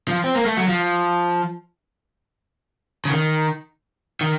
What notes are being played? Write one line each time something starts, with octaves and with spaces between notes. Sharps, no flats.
F3
C4
A#3
A3
F#3
F3
C#3
D#3
D#3